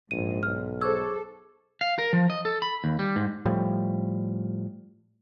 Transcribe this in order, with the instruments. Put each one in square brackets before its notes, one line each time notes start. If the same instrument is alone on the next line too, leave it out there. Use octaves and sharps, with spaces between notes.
[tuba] A#1 [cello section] G#2 [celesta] D#7
[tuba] B1 [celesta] F6
[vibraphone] G#4 C#6 D6 [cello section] A4 [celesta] C5 E6
[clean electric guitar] F5
A#4
F3
D#5
A4
B5
D#2
G3
G#2
[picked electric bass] A2 F3 G3